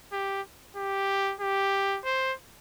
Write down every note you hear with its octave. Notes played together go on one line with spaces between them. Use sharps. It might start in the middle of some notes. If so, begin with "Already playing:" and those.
G4
G4
G4
C5